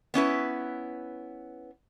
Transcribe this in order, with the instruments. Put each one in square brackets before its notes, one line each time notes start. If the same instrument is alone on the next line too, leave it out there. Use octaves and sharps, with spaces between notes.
[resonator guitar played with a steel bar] B3 C#4 E4 B4